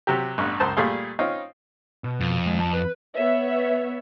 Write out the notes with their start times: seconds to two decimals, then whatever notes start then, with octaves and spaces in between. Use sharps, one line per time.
0.07 C3 F#3 G4
0.38 A1 G2 B3
0.60 C#2 F#2 C5 A5
0.77 A#2 G3 A3 G#4 F5 C6
1.19 C4 C#4 D#4 F4
2.04 B2
2.21 F2
2.46 D#2 G#3
2.60 A5
2.73 B4
3.15 B3 C#5 E5